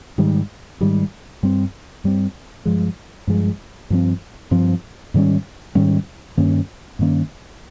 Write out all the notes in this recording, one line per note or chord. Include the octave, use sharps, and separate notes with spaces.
G#2 D#3 G3
G#2 D#3 G3
G2 G3 C4
G2 G3 C4
G2 F3 G#3
G2 F3 G#3
G2 F3 C4
G2 F3 C4
G#2 D#3 G3 C#4
G#2 D#3 G3 C#4
G2 D#3 A#3 C#4
G2 D#3 A#3 C#4